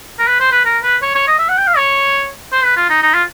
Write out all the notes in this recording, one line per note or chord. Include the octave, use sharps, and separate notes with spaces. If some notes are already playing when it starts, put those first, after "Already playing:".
A#4
B4
C5
B4
A#4
B4
C#5
C#5
D#5
E5
F#5
G5
F5
C#5
C5
B4
F4
D#4
D#4
F4